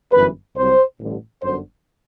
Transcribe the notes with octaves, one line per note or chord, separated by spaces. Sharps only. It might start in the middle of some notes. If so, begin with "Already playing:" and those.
G1 F#2 E3 B4
C2 C3 F#3 C5
A1 G2 D3
G1 F#2 D3 C5